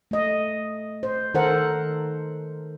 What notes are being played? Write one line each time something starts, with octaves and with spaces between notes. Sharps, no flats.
A3 D#5
C5
D#3 A4 A#4 C5 F#5